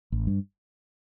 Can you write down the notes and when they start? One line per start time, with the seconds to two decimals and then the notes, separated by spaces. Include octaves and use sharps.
0.12 A1
0.27 G2